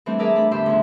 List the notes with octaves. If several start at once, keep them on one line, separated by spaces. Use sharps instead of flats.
E3 G3 A3 C4 D4
G#4 A#4 D5 E5 A5
A3 D4 B5
E2 A2 D3 G4 E5 C6
D2 C#3 F3